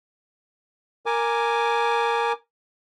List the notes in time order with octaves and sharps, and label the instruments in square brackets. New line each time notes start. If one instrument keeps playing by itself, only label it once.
[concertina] A#4 G#5 D6